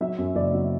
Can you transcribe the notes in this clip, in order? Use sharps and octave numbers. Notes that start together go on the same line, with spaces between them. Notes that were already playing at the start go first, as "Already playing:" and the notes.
F#3 E5
F#2
F#1 D5
F#3